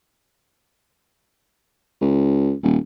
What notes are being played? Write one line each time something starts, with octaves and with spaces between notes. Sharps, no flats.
C#2
D#1